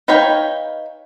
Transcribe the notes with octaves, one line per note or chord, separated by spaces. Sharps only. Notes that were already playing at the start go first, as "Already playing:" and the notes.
D#4 B4 C#5 F5 G5